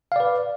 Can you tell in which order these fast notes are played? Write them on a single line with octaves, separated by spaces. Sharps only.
F5 D5 B4